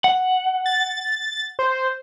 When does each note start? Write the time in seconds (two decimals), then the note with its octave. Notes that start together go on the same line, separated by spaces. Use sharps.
0.04 F#5
0.66 A6
1.59 C5